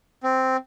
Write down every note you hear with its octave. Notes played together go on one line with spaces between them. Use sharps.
C4